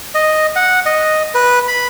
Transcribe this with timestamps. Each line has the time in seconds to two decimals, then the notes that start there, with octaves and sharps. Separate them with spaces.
0.15 D#5
0.56 F#5
0.86 D#5
1.35 B4
1.68 B5